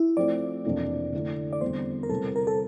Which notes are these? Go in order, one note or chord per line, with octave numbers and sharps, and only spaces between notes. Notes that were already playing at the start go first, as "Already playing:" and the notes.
Already playing: E4
F3 A3 C4 D5
F2 C3 E3 A#3 D4
D3 A3 E4
D5
E2 D3 G3 C4 C5
A#4
C3 G3 C4 E4 A4
A#4
A4